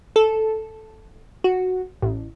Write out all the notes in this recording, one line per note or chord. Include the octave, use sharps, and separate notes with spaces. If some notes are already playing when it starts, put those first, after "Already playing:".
A4
F#4
A1